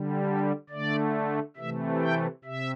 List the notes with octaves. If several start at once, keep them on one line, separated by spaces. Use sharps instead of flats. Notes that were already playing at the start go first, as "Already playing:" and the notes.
Already playing: D3 G3
A4
D3 A3 D5
C3 E3 A3 E5
G5
C3 E5